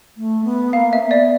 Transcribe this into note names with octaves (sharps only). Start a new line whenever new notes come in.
A3
B3
A#3 F5
E5
C4
B3
D5